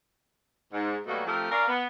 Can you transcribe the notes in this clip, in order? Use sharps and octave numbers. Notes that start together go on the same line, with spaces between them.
G#2
B2 F#3 G3 A3 A#3 F#4
F3 A3 C4 G4 A#4 E5
C#4 A#4 D5 F5
B3